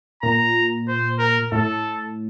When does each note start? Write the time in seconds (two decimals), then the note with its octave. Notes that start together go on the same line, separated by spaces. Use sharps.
0.23 A#2 A#5
0.88 C5
1.19 A#4
1.52 A2 A4